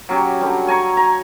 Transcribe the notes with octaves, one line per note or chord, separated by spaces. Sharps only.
F#3 C#4 G4
D3 F#3 G3
C#5 G#5 A#5 C#6
A#5